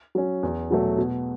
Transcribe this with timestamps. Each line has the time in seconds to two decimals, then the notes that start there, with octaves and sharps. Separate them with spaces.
0.15 F#3 C#4
0.43 E2
0.71 B2 F#3 A3
0.98 B2